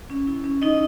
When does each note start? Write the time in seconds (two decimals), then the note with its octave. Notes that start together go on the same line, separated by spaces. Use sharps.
0.10 C#4
0.27 E4
0.44 C#4
0.62 D#4 E4 D#5